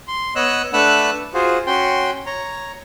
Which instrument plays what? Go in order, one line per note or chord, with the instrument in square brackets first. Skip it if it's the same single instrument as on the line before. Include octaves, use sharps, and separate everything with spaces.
[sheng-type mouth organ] C6
B3 C#5 D#5 E6 F#6
A3 D4 B4 F#5 E6 F#6
F4 F#4 G#4 C5
C#4 F#4 G5 C6
C#5 A#5